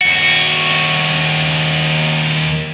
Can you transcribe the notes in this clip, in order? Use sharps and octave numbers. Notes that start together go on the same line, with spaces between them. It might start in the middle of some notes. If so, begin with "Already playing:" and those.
D#2 F#4